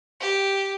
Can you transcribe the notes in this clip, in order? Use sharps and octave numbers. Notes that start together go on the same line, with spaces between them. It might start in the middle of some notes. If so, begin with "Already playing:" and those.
G4